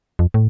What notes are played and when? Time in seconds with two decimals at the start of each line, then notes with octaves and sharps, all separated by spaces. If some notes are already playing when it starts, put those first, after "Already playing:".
0.19 F2
0.34 A2